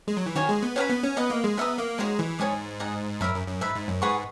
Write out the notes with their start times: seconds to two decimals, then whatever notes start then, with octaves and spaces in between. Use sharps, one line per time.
0.08 G#3
0.17 F#3
0.26 E3
0.35 D#3 F#4 C#5 G#5
0.49 G#3
0.63 B3
0.76 C#4 F#4 B4 F#5 B5
0.90 B3
1.03 C#4
1.16 B3 B4 D#5 F#5
1.30 A#3
1.44 G#3
1.57 B3 B4 E5 A#5 D#6
1.78 A#3
1.98 G#3 D#4 F#4 C#5
2.19 E3
2.39 G#2 C#5 G#5 D#6
2.80 D#4 G#4 D#5 F#5
3.20 F#2 A#4 E5 B5
3.34 F#2
3.48 F#2
3.61 G#2 B4 E5 B5
3.75 G#2
3.88 F#2
4.02 G#2 G#4 B4 F#5 C#6